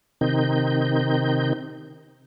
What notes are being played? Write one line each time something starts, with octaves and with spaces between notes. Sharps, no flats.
C3 D#3 C4 D#4 G6